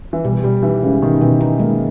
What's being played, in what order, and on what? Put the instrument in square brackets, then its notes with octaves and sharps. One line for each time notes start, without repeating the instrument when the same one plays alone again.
[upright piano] E3
[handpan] B2 [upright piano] G3
[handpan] B2 [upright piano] G3
[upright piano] E3 [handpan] D#4
[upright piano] C#3 [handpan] G#3
[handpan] B2 [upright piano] D#3
[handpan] B2 [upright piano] E3
[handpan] D#4
[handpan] G#3 [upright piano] A#3